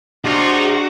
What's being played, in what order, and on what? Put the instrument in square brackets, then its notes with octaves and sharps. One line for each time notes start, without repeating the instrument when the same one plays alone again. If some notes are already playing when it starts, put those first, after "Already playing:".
[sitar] C3 G#3 [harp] D4 [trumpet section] D#4 F4 [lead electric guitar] F#4